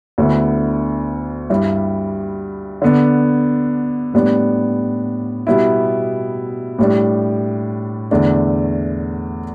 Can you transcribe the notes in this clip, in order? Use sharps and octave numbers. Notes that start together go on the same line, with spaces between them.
D2 D3 B3 E4
G2 G3 E4
D3 B3 D4
A2 G3 B3 D4
B2 G3 B3 E4
A2 G3 D4
E2 D3 A3 D4